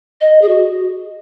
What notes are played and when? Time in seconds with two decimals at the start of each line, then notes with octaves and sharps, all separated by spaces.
0.21 D#5
0.42 G#4
0.49 F#4